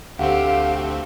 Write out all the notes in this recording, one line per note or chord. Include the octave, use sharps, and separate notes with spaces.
D2 A3 C4 G4 F5 F#5